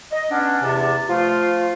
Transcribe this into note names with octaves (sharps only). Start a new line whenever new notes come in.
D#5
B3 C#4 D4
E2 C3 A5
F3 A3 F4